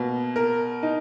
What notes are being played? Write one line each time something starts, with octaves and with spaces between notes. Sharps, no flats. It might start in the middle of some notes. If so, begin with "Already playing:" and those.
Already playing: B2 A#3
A#4
D#4